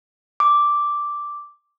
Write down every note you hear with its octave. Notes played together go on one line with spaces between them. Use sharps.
D6